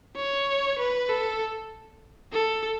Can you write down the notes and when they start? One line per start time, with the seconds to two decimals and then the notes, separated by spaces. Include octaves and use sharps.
0.16 C#5
0.79 B4
1.09 A4
2.32 A4